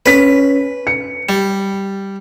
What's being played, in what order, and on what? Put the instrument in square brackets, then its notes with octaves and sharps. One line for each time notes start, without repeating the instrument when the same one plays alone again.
[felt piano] C#4 B6 [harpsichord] B4
[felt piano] C#7
[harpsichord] G3